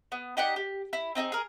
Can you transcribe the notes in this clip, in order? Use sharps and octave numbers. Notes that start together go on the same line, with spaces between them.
B3
D#4 G4 D5 F#5
G4
E4
C4 D#4 E4 G#4
G#4 A#4